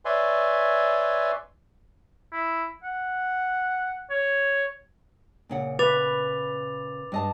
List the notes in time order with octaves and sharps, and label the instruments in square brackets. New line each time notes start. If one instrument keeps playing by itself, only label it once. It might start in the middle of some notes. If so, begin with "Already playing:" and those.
[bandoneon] B4 C#5 D5 E5 G#5 C6
[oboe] E4
F#5
C#5
[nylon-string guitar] A#2 C#3 F#5
[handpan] B4 [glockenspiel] D6 A6 F7
[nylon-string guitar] G2 D#5 A5